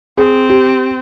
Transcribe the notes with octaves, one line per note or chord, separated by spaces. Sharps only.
C4 G#4
G4